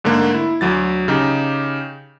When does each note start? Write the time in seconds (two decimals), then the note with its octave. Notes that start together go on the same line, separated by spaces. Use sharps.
0.04 G#2 D3 A3 A#3
0.34 E4
0.61 D2 F#3 A6
1.08 C#3 D#4 G4